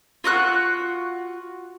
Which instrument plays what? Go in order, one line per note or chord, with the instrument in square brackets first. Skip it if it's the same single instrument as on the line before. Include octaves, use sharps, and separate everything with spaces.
[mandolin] F4 F#4 C#6 F#6